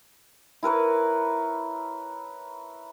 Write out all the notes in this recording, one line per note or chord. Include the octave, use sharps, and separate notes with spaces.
E4 A#4 B4 C#5